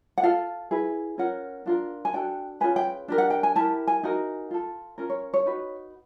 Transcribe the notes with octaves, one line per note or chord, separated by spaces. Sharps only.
F#5
F4 A4 F5
E4 G#4 B4
C#4 F4 A#4 F#5
D4 F4 A#4
G#5
D4 F#4 A4 G5
C#4 F4 G#4 B4 G#5
G5
D4 G4 A#4
F#5
G5
G#5
E4 G4 A#4 A5
G#5
D#4 F#4 A#4
F4 A4
C#4 F4 A#4
C#5
C#5
D#4 F#4 B4